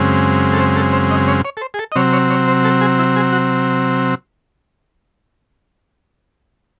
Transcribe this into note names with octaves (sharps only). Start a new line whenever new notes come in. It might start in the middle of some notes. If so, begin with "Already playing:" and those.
Already playing: F#2 C#3 G#3 C4
A4
C5
A4
C5
D#5
C#5
C#5
A4
C5
G#4
A4
D#5
C3 F#3 C4 C#5
C#5
C#5
C5
A4
G#4
E4
G#4
F#4